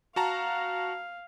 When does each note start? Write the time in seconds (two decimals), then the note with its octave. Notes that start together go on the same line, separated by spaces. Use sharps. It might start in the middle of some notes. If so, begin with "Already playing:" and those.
0.16 F#4 F5 A5 A#5